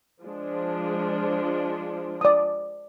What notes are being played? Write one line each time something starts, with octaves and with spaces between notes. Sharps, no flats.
F3 G#3 D4
D5 D#6